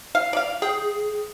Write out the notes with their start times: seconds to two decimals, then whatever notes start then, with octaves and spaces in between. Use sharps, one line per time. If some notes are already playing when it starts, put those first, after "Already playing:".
0.15 F5
0.33 D5 F5
0.62 G#4 G5